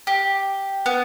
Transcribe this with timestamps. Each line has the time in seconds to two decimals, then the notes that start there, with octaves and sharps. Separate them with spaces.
0.07 G4
0.86 B3